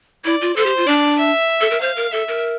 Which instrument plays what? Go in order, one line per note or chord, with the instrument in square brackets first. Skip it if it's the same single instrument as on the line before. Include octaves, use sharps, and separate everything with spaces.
[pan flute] E4 [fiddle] D5
[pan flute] F4
[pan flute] A4 [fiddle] C5
[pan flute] G4
F4
[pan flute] D4 [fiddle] D5
[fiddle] E5
[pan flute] A4
A#4
[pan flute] C5 [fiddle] F5
[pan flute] A#4
[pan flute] A4 [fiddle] E5
[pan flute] A#4